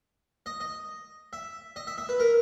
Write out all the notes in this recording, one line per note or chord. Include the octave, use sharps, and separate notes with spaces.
D#5
D#5
E5
D#5
E5
E5
B4
A#4